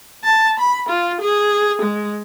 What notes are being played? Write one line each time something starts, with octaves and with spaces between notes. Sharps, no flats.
A5
B5
F4
G#4
G#3